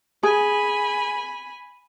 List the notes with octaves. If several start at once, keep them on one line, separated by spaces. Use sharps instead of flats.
G#4 G#5 B5